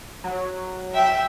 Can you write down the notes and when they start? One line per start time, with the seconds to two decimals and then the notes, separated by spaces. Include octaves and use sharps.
0.24 F#3
0.95 E5 G5